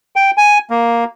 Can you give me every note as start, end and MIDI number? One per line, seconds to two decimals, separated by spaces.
0.16 0.31 79
0.37 0.58 80
0.70 1.04 58